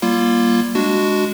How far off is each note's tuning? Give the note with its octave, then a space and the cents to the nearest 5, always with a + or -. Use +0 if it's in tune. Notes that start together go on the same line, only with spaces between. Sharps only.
G3 -10 A#3 +20 F4 -20
G#3 +0 D4 +0 F#4 +0